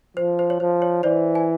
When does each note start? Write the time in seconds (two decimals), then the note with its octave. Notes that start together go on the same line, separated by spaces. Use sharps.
0.17 F3 C5
0.39 C5
0.50 C#5
0.60 F3 C5
0.82 C#5
1.03 E3 C5 D5
1.35 G#5